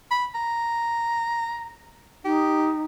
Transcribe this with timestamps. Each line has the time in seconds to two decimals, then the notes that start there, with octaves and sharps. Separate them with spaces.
0.11 B5
0.35 A#5
2.25 D#4 G4